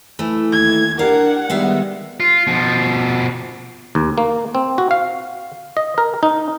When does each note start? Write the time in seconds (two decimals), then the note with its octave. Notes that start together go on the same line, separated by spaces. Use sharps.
0.19 E3 A3
0.52 D#2 G#6
0.99 D4 G4 A#4 F5 F#5
1.50 D#3 G3 G#3 B3 E5 F5
2.20 F4
2.47 B2 F3
3.95 D#2
4.18 A#3
4.55 C4
4.78 F#4
4.91 F5
5.77 D#5
5.98 A#4
6.23 D#4